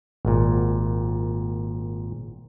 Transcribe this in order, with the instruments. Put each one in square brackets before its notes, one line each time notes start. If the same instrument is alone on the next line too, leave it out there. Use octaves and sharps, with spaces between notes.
[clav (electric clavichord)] G#1 A#2